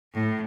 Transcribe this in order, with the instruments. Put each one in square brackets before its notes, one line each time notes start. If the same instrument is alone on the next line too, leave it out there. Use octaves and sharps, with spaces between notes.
[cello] A2